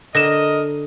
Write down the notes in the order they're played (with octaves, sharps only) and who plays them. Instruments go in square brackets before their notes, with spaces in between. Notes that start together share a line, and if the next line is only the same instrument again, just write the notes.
[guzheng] D3 [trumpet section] A#4 D#5 [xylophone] A#6 E7